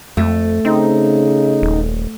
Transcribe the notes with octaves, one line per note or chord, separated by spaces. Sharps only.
F2 A3
C#3 C4 D#4
D#1